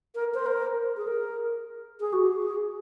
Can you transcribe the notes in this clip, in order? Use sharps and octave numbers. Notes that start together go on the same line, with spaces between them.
A#4
C5
A#4
G#4
A#4
G#4
F#4
G#4